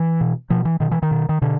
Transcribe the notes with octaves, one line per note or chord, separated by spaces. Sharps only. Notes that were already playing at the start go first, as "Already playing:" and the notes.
Already playing: E3
B2
B2 F3
E3
B2 D#3
E3
D#3
B2
D#3
B2 D3